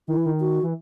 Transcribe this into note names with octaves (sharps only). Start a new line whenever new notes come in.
D#3 E4
E3
D#3
F#4
E3